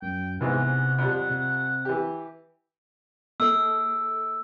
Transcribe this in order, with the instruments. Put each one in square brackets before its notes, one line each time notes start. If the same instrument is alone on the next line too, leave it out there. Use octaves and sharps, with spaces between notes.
[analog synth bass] F#2 [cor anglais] G5
[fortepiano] E2 G#2 E3 [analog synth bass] C3 [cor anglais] F#5
[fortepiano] F2 G3
[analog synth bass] C3
[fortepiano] E3 G4
[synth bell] A#3 A4 [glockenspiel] E6